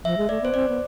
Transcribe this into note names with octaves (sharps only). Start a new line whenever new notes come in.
F3 E5
G#3
A3 D5
B3 C5
C4 D5
B3